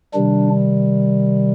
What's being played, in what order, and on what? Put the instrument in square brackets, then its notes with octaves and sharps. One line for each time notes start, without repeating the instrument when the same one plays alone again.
[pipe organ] C3 D#3 G3 D4